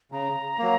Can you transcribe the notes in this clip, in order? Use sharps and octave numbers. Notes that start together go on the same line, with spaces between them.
C#3 A#5
F#3 A#3